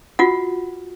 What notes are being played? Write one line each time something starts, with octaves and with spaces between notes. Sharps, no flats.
F4 F#4 F#5